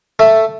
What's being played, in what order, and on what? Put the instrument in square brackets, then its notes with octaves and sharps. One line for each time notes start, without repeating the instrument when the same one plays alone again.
[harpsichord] A3